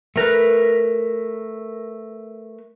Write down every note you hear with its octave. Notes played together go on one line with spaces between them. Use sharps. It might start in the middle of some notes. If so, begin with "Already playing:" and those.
A3 A#4 B4